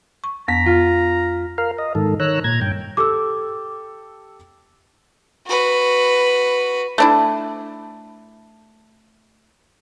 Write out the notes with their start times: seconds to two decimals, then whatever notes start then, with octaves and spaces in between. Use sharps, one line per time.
0.24 C#6
0.48 F2 B3 A#5 B6
0.66 F4
1.58 A#4 F5
1.78 D#5
1.95 G#2 D#3 A4
2.20 D#3 C#5 A#5 E6 F#6
2.44 A#2 A#5 G#6
2.61 G2 G5
2.97 G4 A4 D6 E6
5.47 F#4 B4
6.98 A3 D4 E4